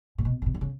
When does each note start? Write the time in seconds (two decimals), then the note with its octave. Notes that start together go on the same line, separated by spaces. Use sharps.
0.18 A#2
0.25 B2
0.42 C#3
0.46 C3
0.54 D3
0.61 C#3